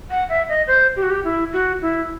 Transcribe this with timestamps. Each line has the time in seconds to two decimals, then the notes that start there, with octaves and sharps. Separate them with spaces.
0.10 F#5
0.29 E5
0.49 D#5
0.67 C5
0.96 G4
1.03 F#4
1.10 G4
1.24 E4
1.53 F#4
1.82 E4